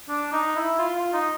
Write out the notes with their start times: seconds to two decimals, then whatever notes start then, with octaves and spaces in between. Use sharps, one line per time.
0.09 D4
0.33 D#4
0.56 E4
0.79 F4
0.96 F4
1.13 D#4